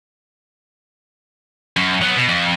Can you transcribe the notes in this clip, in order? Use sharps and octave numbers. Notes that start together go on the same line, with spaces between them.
F#2
F#3 B3
B2
F2